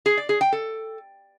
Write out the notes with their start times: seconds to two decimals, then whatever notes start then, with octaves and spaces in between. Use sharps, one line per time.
0.06 G#4
0.17 D5
0.29 G#4
0.41 G5
0.52 A4